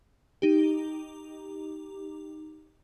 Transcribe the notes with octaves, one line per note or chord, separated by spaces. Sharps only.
D#4 G4